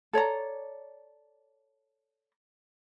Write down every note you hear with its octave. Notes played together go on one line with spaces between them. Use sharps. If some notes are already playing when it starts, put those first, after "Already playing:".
A4 C#5 D5 A#5